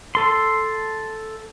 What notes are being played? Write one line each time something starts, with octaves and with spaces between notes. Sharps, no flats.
A4 C6